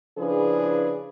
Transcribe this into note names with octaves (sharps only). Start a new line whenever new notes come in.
C#3 F3 D4 E4 G#4 B4